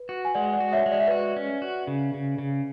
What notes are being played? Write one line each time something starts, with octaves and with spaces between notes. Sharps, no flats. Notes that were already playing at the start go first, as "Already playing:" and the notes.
Already playing: B4
F#4
G#5
G#3 D5 F#5
D5 F#5
F#4
C#5 E5
G#3
D5
E5
F#4 B4 D5
C#4
F#4
C#3
C#3
C#3